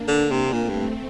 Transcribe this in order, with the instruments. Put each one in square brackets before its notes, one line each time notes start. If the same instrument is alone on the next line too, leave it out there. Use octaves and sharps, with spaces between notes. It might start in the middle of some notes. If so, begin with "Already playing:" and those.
Already playing: [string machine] A#3 D4
[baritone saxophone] D3
C3
[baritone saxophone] A#2 [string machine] A3 C4
[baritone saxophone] G2